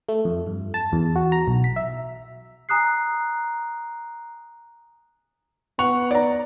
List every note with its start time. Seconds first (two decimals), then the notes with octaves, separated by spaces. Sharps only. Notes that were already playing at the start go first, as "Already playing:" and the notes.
0.09 A3
0.25 F2
0.47 G2
0.74 A5
0.93 E2
1.16 F#4
1.32 A#5
1.48 B1
1.64 B6
1.76 E5
2.69 G#5 A#5 D#6 F#6 C7
5.79 B3 F#5 C#6 F7
6.11 D5 A#5